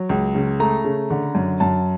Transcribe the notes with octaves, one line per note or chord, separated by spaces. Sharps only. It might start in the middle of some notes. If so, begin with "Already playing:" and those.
Already playing: F#3
C#2
C#3
A3 A#5
C#3
D3
F#2
F#2 A5